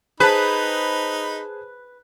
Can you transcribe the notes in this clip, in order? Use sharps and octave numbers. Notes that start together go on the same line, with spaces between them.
D#4 G#4 B4 C5 A5 B5